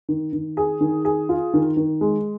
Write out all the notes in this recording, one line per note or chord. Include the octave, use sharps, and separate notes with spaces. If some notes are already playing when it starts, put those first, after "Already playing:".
D#3
D#3
G#4
D#3
G#4
F4
D#3
D#3
G#3